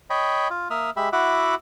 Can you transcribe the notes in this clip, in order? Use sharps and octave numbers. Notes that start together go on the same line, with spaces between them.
C#5 D#5 G5 B5
F4
A#3 E5 D#6 F6
G#3 G4 E5 B5
E4 F#4 E5 F#5 D6